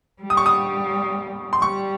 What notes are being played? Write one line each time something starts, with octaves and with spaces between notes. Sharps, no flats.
G3
D#6
C#6
D#6
C6
G3 C#6